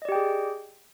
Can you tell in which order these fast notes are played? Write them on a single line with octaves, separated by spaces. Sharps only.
D#5 D5 G4 G5 G#4